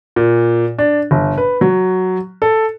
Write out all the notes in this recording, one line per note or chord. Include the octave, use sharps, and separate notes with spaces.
A#2
D4
G1
B4
F#3
A4